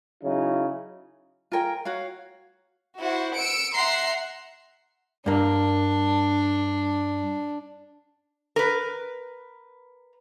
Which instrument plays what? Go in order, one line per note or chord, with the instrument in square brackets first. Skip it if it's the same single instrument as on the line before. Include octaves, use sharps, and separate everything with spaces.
[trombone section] C#3 F#3 D#4 E4
[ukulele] F4 G#4 A#4 G5
F#4 C#5 F5
[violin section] E4 F#4 C5
E6 C#7 D7
E5 F#5 A#5 C6 C7
[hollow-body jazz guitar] G2 A#3 [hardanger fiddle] D4
[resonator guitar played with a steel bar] A#4 B4